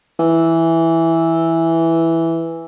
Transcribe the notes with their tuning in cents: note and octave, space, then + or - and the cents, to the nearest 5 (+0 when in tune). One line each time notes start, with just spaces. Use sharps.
E3 +0